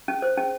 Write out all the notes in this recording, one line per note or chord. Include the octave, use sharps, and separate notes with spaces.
C#4
C5
C#4